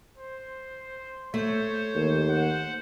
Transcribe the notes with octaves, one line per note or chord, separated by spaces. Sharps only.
C5
A3 C5 C#5
D#2
F#5